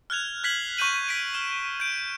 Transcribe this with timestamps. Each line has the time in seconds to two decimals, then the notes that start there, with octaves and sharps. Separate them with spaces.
0.10 F6 F#6 G#6 F7
0.44 F#6 G#6 B6 C7 F#7
0.77 C#6 F#6 G6 D#7 F#7
1.09 B6 D7
1.34 F6 E7
1.80 G6 D7